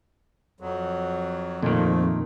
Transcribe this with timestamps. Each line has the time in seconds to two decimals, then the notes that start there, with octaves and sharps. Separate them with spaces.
0.61 F2 F#3
1.63 F2 A#2 D#3 A3